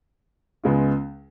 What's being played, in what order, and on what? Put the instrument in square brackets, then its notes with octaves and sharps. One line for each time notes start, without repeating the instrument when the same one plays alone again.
[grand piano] C#2 C#3 G#3 B3 F4